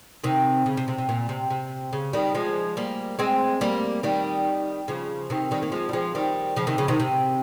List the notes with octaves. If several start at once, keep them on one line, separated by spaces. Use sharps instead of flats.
C3 D#3
C#3
C3
C3
C3
A#2
C3
C3
C#3
D#3 G3
F3 G#3
G3 A#3
G#3 C4
G3 A#3
D#3 G3
C#3 F3
C3 D#3
D#3 G3
A#3
F3 G#3
G3
F3 G#3
D#3 G3
C#3 F3
C3 D#3
C#3 F3
C3 D#3
C3